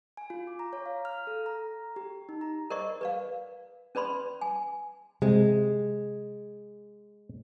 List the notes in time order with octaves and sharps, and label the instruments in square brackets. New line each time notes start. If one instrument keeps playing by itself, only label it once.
[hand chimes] G#5
F4
D6
A#5
C#5
F5
F6
A4
A#5
G4
D#4
A#5
[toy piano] A#4 C5 D5 D#5 C#6
B4 D5 F5
C#4 B4 D5 B5 C6
G#5
[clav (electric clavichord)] C3 [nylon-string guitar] G#3